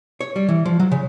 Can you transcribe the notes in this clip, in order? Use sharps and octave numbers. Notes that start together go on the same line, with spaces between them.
C#5
G3
E3
F3
F#3
C#3